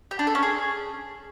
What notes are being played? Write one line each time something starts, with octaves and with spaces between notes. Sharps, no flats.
G4
D4
A4
C#4
G#4